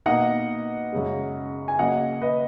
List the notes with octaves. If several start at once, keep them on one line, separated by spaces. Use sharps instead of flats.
B2 A#3 D#4 D#5 F#5
F#2 C#3 G#3
G#5
C#3 F#3 A#3 D#5 F#5
B4 D#5